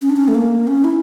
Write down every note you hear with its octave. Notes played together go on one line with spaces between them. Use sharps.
C#4
D4
C#4
A3
A#3
C#4
E4